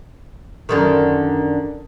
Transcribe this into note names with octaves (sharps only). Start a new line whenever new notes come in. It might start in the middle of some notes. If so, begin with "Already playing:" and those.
F#2 D3 D#3